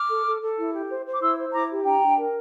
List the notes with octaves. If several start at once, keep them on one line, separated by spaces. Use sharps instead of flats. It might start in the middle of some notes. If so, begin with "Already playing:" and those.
Already playing: D6 F6
A4
A4
A4
E4
G4
C5
C5
D6
E4 C6 E6
C5
E4 A#5 D6
G4
D4 G5 A#5
D4
A#4